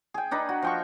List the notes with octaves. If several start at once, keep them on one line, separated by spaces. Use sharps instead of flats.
G#4 G5
D4 D#4 B4 A#5
F#4
F3 G5 C#6